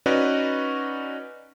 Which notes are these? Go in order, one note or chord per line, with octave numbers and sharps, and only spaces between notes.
C#4 D#4 F#4 B4 D5 D#5